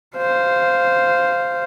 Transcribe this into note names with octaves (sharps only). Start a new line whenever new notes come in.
C5 F5